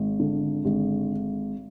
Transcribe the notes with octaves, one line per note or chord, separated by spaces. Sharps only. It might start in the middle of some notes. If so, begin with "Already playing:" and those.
Already playing: G#1
D3
G#1